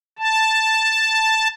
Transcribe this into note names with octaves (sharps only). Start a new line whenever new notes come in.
A5